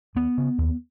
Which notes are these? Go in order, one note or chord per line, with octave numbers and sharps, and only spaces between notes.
D#2 B3
C#3
D#2